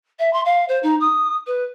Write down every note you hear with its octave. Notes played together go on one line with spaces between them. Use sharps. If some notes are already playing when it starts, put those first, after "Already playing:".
E5
C6
F5
C5
D#4
D#6
B4